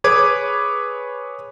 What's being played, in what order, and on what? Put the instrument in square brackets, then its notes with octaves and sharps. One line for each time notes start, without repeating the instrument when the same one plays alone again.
[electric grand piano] G#4 B4 C#5 D6 G#6